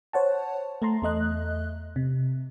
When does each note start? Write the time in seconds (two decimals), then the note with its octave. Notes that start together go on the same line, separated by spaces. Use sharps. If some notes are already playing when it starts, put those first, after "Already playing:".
0.13 C5 C#5 F#5 A5
0.82 A3 A5 A#5 C6
1.02 E2 A3 D#5 F#6
1.96 C3